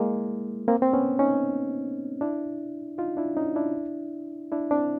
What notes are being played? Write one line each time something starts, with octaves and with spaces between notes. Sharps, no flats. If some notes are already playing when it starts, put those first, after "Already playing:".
Already playing: G#3 A#3 E4
A#3 C4
C4
B3 C#4
C#4 D#4
D4 E4
D#4 F4
D4 E4
C#4 D#4
D4 E4
D4 E4
C4 D4